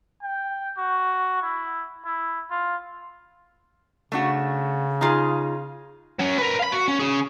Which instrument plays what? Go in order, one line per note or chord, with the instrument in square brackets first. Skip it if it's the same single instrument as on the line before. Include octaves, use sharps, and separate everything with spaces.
[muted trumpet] G5
F#4
E4
E4
F4
[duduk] C#3 [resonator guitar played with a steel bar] A3 D4 F#4
[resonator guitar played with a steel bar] D#4 F4 G#4
[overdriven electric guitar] F#3 C#4
A#4 B4
F5 B5
F#4
C#4
C#4 G#4